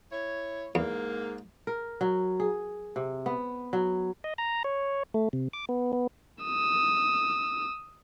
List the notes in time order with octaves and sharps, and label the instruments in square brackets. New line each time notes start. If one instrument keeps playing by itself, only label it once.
[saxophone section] E4 C#5
[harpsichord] E2 [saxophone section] G#2 A#3
[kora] A#4
F#3
G#4
C3
B3
F#3
[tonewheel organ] D#5
A#5
C#5
A3
C3
D6
B3
B3
[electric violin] D#6 E6